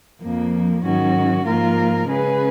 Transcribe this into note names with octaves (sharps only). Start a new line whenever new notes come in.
F2 F3 A#3
G#2 D#3 F#3 C#4 F#4
G#2 F3 A#3 F4 A#4
C#3 G#3 C#4 G#4 B4